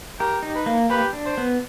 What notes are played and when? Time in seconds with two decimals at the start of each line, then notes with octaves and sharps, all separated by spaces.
0.20 G4 A#4
0.43 D#4
0.55 B4
0.66 A#3
0.90 G4 B4
1.13 D4
1.26 C5
1.38 B3